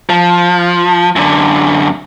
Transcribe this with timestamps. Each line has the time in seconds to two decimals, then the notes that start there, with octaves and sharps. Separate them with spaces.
0.09 F3
1.16 F#2 D3